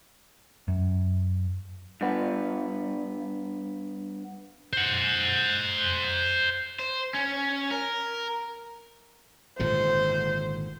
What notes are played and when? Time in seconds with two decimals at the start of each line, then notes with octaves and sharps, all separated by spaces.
0.68 F#2
2.01 G2 B3
4.73 C5 F#5
6.80 C5
7.14 C#4
7.71 A#4
9.59 G#1 A#2 D3 C5